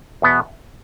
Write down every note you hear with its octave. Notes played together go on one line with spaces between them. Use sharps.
E2 B2 B3